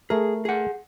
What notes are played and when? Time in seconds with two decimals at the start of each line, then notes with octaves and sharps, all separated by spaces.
0.10 A3 G#4 A#4
0.45 G#4 F#5